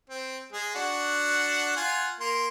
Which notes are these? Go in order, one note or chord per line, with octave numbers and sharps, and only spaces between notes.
C4
G#3 G#4
D4 F#4 F#5
F4 F#5 G#5
A#3 C6